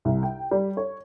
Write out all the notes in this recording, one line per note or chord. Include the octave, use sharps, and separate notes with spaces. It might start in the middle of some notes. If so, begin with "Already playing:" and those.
C2
G5
G3
C#5